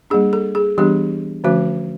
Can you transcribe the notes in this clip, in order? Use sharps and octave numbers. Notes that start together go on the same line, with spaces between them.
G3 A#3 D4 G#4
A4
G#4
E3 G3 B3 D4 G4
D3 F3 A3 C#4 F#4